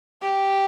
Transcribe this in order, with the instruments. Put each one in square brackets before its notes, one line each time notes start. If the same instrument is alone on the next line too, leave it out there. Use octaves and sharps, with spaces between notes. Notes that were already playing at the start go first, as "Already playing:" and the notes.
[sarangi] G4